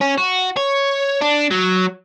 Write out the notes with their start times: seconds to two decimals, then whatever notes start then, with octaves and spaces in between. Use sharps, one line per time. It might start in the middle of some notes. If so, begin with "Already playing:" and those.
0.01 C#4
0.18 F#4
0.56 C#5
1.21 D4
1.51 F#3